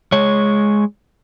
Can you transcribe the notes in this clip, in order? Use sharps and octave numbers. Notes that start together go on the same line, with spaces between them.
G#3 C#5